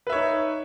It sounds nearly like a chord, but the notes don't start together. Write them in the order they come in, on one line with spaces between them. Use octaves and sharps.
B4 E5 C#5 D#4